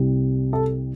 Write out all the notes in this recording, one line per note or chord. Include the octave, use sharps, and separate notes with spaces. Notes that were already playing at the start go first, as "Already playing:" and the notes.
Already playing: C2 C3 G3
A4